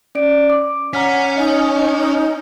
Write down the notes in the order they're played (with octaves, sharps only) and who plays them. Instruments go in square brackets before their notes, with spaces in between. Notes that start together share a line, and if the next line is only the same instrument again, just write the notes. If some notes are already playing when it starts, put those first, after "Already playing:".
[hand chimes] C#4 D5 D7
D6
[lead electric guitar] C#4 [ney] F#5 [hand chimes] A#5 F6 B6
[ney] D#4 [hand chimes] D#5